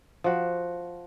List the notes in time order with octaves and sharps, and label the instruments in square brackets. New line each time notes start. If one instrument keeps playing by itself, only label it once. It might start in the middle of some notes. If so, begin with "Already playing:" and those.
[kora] F3 F#4